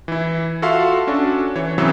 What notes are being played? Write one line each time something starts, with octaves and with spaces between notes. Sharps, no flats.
E3 E4
F4 F#4 A4 E5 F5 C6
C#4 D4 F#4 A4
E3 C#5
G#1 C#3 E3 F#3 C4 E6